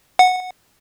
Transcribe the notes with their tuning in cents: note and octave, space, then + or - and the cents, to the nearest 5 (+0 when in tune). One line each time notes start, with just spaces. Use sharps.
F#5 -10